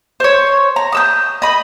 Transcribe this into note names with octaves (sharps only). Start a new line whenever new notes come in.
C5 C#5
A#5
D#6 E6 G6
D#5 B5